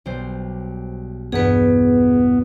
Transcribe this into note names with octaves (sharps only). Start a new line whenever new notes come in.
B1 G3 C5
E2 G2 B3 G#4 B4